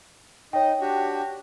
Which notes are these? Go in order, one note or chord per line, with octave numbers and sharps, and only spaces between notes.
D#4 C#5 D#5 G5
D4 F#4 G4